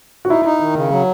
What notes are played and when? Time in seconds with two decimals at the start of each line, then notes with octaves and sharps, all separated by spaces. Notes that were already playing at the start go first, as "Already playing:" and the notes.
0.25 F#4
0.30 D#4 E4
0.45 D#4
0.60 D#3
0.76 C#3
0.91 F#3